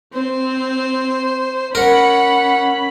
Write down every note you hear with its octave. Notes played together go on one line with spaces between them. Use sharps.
C4 C5
C#4 A#4 F#5 B5